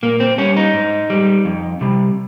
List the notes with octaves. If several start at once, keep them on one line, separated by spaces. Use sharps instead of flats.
A#2 A#3
C4
G3 C#4
D#4
G#2
G3
F2
C3 G3